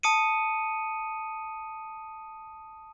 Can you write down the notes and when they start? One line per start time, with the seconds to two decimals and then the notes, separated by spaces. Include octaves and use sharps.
0.03 A5 D#6 C#7 D#7